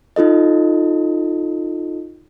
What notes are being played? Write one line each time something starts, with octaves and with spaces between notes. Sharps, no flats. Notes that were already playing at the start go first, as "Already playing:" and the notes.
D#4 F4 A4 D#5